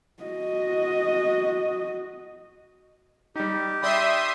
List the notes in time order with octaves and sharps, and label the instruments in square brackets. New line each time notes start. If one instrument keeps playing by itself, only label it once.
[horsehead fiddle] F#4 D#5
[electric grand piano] G3 D#4 [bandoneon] G4
[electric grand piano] D5 G5 B5 [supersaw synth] E5 C6 D#6